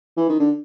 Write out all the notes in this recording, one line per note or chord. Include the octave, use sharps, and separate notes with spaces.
E3
D#3
D3